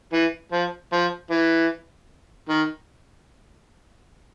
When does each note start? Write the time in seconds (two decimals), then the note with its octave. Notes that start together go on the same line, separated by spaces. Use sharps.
0.13 E3
0.52 F3
0.93 F3
1.31 E3
2.49 D#3